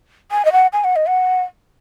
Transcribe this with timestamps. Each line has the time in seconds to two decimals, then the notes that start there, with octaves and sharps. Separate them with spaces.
0.31 G#5
0.45 D#5
0.52 F#5
0.73 G#5
0.84 F#5
0.96 D#5
1.07 F#5